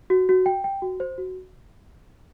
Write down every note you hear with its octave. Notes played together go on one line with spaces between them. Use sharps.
F#4
F#4
G5
G5
F#4
C5
F#4